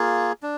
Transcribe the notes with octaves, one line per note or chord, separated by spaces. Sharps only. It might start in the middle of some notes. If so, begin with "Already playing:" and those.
Already playing: A#3 F4 G#4
D4